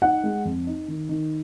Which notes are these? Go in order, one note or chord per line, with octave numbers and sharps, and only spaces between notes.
D#4 F#5
G#3
F2
D#4
D#3
D#3